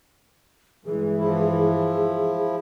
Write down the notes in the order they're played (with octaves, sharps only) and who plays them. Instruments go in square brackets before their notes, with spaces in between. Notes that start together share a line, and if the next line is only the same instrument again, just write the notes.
[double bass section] G2 E3 G#3 [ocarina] G#4
[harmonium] F3 E4